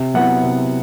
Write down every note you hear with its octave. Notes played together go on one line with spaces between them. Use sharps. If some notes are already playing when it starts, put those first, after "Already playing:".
Already playing: C3
F#3 B3 E4 F#5
C3